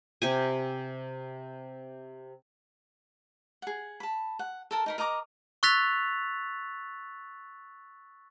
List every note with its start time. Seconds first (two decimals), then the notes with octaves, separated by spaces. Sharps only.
0.22 C3 G4 G#5
3.62 G#4 F#5
4.00 A5 B5
4.39 F#5
4.71 A4 A#4 A5
4.86 D#4 A#4 B5
4.98 A#4 D#5 A#5 D6
5.63 C#6 E6 F#6 A6 B6 F7